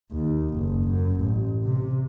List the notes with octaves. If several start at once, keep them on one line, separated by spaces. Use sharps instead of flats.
D#2
F#1
F#2
A1
C3